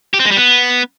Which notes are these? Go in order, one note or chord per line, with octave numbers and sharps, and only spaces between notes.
G4
C4
G#3
G3
B3